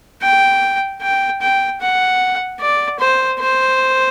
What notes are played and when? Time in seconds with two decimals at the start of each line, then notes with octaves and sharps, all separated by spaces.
0.22 G5
1.02 G5
1.41 G5
1.81 F#5
2.60 D5
3.00 C5
3.40 C5